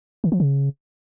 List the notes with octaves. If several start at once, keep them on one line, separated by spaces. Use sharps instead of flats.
D#3
F3
C#3